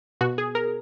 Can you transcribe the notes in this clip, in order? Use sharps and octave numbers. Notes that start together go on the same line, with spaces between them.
B2 F#4
G#4
A#4